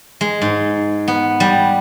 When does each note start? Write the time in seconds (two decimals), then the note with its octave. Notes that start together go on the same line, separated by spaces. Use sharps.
0.21 G#3
0.42 G#2
1.08 B3
1.40 G3